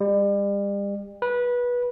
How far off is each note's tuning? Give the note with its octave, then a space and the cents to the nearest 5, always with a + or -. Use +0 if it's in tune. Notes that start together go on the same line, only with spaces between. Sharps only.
G3 +40
B4 -20